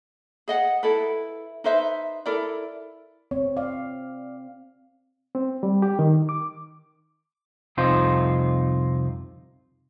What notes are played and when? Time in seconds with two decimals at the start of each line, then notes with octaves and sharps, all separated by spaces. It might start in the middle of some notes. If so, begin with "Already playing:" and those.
0.48 G#4 D#5 F#5
0.83 E4 A4 B4
1.64 D#4 B4 C5 E5
2.26 E4 A4 A#4 D5
3.31 C4 C#5
3.57 D5 F5
5.35 C4
5.63 G3
5.82 G4
5.99 D#3
6.29 D6
7.77 C2 F2 C3 D#4 F4 C5